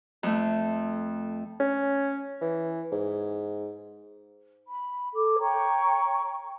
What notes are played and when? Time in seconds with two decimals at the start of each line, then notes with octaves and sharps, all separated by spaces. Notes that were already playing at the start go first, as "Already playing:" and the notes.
0.23 F2 A3
1.60 C#4
2.41 E3
2.92 G#2
4.66 B5
5.13 A4 D6
5.38 C#5 G5 A#5 C#6